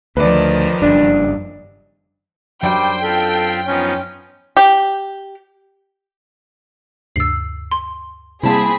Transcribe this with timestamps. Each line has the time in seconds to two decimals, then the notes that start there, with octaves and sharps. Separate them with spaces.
0.17 D2 D#3 F3 B4 D5
0.82 F#1 G2 D4
2.63 F#2 F#3 G3 D4 C5 G5
3.03 C4 F4 A4 B5
3.67 F3 B3 C#4 D#4
4.57 G4
7.16 D2 G2 C3 E6 C7
7.71 C6
8.43 C3 G3 A#3 C4 E4 G#4 A5 B5